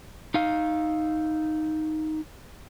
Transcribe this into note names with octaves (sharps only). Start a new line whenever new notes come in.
D#4 F5